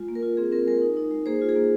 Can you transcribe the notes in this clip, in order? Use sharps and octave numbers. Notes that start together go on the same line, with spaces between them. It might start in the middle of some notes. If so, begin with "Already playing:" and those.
Already playing: G#3 F4
A#3
A#4
F4
C4 G#4
C4 A#4
G#3 A#4
D#4
D#4
G#3
A#3 G#4 C5
F4
G#4
A#3